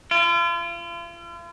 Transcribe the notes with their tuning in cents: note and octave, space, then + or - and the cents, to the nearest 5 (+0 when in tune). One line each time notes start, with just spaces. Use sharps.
F4 -40